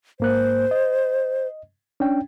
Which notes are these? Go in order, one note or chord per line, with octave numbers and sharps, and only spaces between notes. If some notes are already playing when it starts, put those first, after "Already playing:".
G#2 A#3 C5 F#6
D#5
C#4 D4 G5